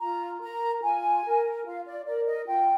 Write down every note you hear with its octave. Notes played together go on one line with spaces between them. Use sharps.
F4 A#5
A#4 A#5
F4 G#5
A#4
F4 F5
D5
A#4 D5
D#5
F4 G5